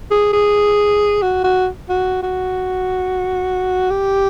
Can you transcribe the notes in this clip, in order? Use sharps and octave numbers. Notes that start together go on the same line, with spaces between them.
G#4
G#4
F#4
F#4
F#4
F#4
G4